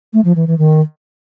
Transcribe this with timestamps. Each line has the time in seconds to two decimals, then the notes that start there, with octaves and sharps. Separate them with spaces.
0.13 A3
0.25 F3
0.36 E3
0.47 E3
0.58 D#3